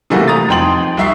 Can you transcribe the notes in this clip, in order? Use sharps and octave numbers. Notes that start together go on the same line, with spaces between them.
C3 E3 G3 A3 A#3 F#4
A#5 D#6 A6
F2 D#4 G5 C6 F#7
C2 D#4 E5 C#6 C7